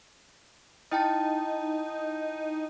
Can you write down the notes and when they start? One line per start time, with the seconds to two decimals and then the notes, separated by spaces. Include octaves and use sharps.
0.92 D#4 E4 G5 A5